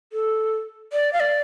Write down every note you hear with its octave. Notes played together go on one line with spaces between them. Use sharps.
A4
D5
F5
D5